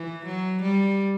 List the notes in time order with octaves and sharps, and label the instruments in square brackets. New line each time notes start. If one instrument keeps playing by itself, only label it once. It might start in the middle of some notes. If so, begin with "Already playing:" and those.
Already playing: [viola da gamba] E3
F#3
G3